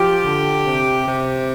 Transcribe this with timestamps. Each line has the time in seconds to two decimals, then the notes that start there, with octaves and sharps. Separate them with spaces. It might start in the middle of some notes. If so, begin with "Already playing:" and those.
Already playing: F3 G4
0.24 D3
0.65 C3
1.07 C3